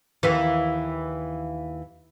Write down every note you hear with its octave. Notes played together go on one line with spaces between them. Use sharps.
D#2 E3